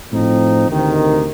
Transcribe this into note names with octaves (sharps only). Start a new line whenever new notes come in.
A2 F3 C4 D#4
D2 C3 D#3